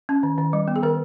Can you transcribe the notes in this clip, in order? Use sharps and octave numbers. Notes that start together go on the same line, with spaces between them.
C#4
D#3
D#3
G3
B3
G#4
D#3 A#4